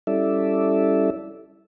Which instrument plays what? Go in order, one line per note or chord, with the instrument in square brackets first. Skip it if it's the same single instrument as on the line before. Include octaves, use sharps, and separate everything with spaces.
[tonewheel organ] G3 C#4 E4 A4 D5 E5